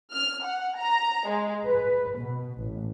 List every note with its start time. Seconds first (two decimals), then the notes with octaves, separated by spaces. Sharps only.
0.14 F6
0.45 F#5
0.77 A#5
1.29 G#3
1.66 B4
2.16 B2
2.59 A1